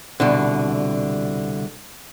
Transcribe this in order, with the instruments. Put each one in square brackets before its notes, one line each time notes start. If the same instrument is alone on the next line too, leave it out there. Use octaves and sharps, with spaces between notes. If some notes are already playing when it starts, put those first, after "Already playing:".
[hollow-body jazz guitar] C2 B2 D3